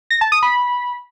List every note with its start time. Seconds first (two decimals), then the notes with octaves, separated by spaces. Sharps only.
0.10 A#6
0.21 A5
0.32 D#6
0.43 B5